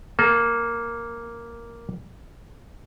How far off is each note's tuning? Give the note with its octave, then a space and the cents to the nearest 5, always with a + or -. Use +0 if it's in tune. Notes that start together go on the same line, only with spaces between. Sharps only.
A#3 +0 A4 -35